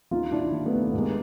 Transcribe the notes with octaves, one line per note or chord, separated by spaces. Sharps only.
D#2 D#4 F4
D#3 D4 E4
D#2
A3 B3
D#3
A#3
B3
G2 G#3 A#3